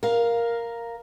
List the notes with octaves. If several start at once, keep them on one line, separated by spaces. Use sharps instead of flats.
A#4 F5